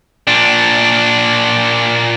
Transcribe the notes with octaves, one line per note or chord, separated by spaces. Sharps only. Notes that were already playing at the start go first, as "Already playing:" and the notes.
A#2 D4